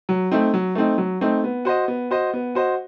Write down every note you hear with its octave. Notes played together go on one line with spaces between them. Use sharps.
F#3
A3 C4 D#4
F#3
A3 C4 D#4
F#3
A3 C4 D#4
B3
F#4 C5 D#5
B3
F#4 C5 D#5
B3
F#4 C5 D#5